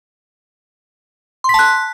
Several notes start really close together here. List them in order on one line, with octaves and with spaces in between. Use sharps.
C6 B6 A5 F#6